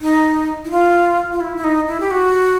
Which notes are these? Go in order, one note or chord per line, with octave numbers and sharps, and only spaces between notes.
D#4
E4
F4
F4
E4
E4
D#4
E4
G4
F#4